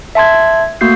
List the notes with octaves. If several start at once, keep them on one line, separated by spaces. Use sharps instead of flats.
E5 A5 C6 G#6
A3 A#3 F#4 G6 C7